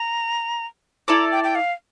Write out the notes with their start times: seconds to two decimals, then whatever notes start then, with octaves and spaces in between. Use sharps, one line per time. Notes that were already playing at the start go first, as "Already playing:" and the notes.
Already playing: A#5
1.08 E4 A4 D5 A#5
1.32 G5
1.44 G5
1.55 F5